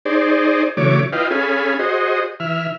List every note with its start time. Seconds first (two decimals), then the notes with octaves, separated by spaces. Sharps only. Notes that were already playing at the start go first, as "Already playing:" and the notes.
0.05 D#4 G#4 C5 D5
0.77 C#3 E3 F#3 A3 C#5 D6
1.13 E4 F4 B4 D#5 F5 G5
1.31 C#4 G#4 A4 F5 G#5 B5
1.79 F#4 G#4 C5 D#5
2.40 E3 E5 F6